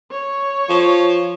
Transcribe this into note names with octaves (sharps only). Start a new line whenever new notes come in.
C#5
F3